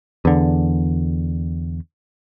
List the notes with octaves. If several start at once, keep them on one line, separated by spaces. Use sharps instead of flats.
E2 D3